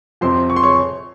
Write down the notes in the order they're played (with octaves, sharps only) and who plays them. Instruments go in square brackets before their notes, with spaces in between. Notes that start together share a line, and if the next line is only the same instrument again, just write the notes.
[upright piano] F2 C3 F3 C5 C6
C#6
C6
C#5 C#6